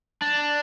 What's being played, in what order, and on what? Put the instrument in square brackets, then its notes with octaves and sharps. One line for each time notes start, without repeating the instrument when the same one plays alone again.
[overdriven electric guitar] D4